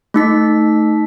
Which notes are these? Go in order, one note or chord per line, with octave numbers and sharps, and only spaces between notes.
A3 D#4 B6